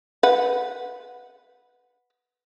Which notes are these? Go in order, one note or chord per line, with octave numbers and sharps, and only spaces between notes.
B4 F#5